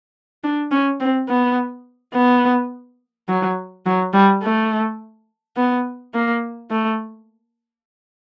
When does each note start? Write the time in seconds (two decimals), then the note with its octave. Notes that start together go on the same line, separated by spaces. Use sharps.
0.44 D4
0.71 C#4
1.00 C4
1.29 B3
2.14 B3
3.28 F#3
3.86 F#3
4.14 G3
4.43 A3
5.57 B3
6.14 A#3
6.71 A3